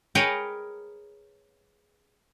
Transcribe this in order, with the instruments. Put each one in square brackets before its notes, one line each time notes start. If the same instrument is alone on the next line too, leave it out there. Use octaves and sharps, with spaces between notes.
[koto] G#4 A#4 B4 C#5 D#5 G5